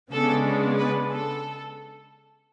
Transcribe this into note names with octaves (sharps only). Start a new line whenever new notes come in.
C#3 G#3 B3 D4 A4
B4
A4